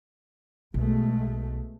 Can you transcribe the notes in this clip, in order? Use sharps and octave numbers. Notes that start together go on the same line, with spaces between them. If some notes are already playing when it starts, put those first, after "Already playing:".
B1 B2 G#3 A3